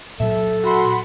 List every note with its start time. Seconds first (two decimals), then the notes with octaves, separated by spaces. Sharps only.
0.20 A#2 F#3 A4 E5
0.63 F#4 F#5 B5 C6